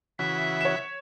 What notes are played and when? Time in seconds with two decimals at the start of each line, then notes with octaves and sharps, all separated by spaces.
0.19 C#3 E3 F#4 E5
0.61 C#5 E7